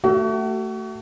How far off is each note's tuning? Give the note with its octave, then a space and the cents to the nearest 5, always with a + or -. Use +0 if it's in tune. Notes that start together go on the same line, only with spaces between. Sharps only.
A3 +15 F#4 +35